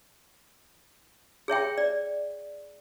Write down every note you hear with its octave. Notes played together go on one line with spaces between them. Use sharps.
G#4 C#5 E5 G5
D5